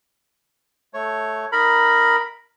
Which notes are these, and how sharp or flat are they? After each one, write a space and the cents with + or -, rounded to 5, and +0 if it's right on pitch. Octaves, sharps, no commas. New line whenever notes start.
A3 -10 C#5 +0
D#4 +0 A#4 +0 B5 +0